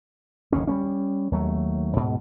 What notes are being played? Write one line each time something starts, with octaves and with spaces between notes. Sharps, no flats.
F#1 D#2 A2 C#4
G3 A3 C#4
D#2 F#3 A3
G#2 B2